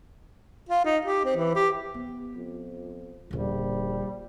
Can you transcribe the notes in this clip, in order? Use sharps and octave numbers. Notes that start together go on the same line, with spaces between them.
F4
D#4
G4
C4
E3
G4
B3
F2
D#1 A#1 D3 G3